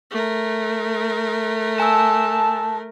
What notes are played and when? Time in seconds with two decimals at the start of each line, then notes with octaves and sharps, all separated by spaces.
0.11 A3 A#4
1.80 G#5 A5 E6